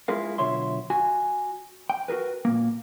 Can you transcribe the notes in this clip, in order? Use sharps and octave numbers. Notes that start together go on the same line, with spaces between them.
G#3 E4 F4 G#4 A#4 F5
B1 D3 F4 C#5 E5 C6
F#4 G#5
G5
F#4 G#4 A#4 B4
A#2 A#3